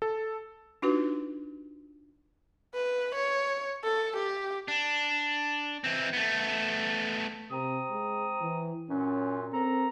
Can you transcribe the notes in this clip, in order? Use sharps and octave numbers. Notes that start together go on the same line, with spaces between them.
A4
D4 D#4 F4 F#4 B4
B4
C#5
A4
G4
D4
E3 C4
A3 B3
C3 C4 A#5 D#6
G#3
E3
F#2 A#2 C#4
C4 A4 A#4 A#5